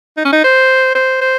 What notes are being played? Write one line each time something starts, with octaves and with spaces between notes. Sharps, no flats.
D#4
C#4
D#4
C5
C5
C5